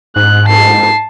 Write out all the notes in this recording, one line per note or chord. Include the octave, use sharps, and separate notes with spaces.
G#2 F#6
A5 C7